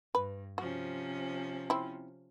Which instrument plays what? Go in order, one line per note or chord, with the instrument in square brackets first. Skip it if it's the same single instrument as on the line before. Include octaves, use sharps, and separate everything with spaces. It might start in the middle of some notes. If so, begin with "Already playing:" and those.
[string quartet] G2 [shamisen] B4
[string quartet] C3 F3 C#4 [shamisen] F#4
[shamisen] C4 E4